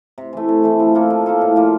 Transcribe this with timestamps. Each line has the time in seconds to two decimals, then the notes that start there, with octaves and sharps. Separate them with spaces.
0.18 C3
0.33 E3 A3
0.49 C3
0.64 E3 A3
0.80 F3
0.95 A#3 F4 A4
1.10 F3
1.26 A#3 F4 A4
1.41 A2
1.56 F3 A#3